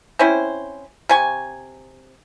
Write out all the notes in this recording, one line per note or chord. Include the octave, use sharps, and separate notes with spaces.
C4 C#4 E4 C5
C3 G#5 C#6